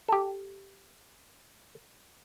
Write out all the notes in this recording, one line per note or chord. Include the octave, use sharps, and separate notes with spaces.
G4 A4